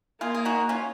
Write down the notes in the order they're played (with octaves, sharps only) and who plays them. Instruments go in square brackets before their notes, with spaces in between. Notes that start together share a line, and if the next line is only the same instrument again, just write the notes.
[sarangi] A#3 [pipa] F4 G#4
[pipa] G#4
D#4 F#4
C#4 F4